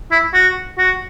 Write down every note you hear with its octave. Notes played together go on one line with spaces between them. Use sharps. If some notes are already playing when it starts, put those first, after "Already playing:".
E4
F#4
F#4